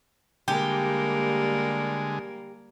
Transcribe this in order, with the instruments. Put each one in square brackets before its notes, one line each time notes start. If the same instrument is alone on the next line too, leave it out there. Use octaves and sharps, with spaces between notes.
[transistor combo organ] D3 G#3 G#5 [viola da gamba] G3 A#3 A#4 [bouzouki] G4